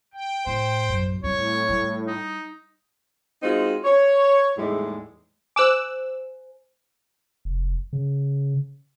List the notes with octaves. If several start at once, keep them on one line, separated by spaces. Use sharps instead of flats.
G5
A2 C5
A#1 F#2
A2 G3 C4 C#5
G3
D#4
G#3 C4 D#4 F4 F#4
C#5
E2 A2 G3 G#3 D#4
C5 G#5 D6 E6 F#6
F1
C#3